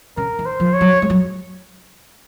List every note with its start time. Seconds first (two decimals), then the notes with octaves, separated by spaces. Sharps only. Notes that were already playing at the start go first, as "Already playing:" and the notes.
0.17 C#3 A#4
0.39 D#3
0.46 C5
0.60 F3
0.74 C#5
0.81 F#3
1.02 G#3
1.10 F#3